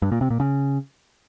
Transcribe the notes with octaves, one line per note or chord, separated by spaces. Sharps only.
G2
A#2
C3
A#2
C#3